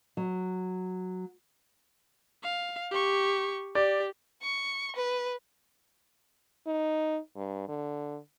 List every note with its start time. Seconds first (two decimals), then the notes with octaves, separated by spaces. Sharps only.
0.17 F#3
2.43 F5
2.91 G4 C#6
3.75 G4 D5
4.42 C#6
4.96 B4
6.67 D#4
7.36 G2
7.68 D3